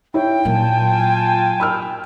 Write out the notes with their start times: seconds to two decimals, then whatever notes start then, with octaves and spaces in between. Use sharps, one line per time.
0.14 E4 C#5 G5
0.45 A#2 F#3 A#3 F4 G#5 A5
1.60 B5 E6 F6